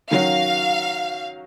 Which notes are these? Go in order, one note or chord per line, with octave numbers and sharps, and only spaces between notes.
D#3 F#3 C#4 F#4 F5